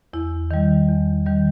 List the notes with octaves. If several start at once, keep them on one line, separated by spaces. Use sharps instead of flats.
E2 E4
D#3 G3
E2
D#3 G3